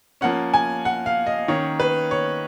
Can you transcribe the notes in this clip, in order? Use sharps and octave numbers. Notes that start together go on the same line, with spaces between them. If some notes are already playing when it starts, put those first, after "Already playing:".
F3 A#3 C#4 F#5
G#5
F#5
F5
D#5
D#3 A#3 C#4 C#5
B4
C#5